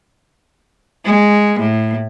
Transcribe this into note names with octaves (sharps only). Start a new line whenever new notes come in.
G#3
A2